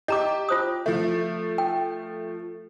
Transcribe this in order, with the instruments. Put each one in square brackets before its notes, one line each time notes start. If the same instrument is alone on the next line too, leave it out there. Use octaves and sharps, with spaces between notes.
[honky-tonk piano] G4 [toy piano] D#5 A#5 D6
[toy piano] F4 C5 D#6
[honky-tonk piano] F3 A3
[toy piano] G5